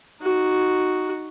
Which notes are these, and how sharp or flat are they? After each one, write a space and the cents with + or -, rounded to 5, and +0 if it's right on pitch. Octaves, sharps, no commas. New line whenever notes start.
D#4 +0 F#4 +0